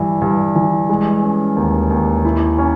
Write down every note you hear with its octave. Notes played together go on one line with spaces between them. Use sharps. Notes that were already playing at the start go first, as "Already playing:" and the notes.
Already playing: G2 E3
G2
E3
G#3
C#4
D#2
D#2
E4
C#4